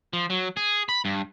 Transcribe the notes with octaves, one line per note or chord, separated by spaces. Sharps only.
F3
F#3
G#4
B5
G2